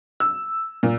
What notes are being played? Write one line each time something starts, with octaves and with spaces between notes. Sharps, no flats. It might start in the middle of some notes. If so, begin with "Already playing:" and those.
E6
A#2